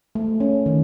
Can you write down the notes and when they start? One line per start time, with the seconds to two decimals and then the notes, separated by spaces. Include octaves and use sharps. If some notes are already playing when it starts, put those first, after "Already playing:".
0.15 A3
0.40 C#4
0.66 D#3